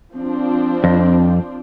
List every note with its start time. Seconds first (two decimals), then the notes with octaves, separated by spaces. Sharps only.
0.15 F3 C4 D4
0.84 F2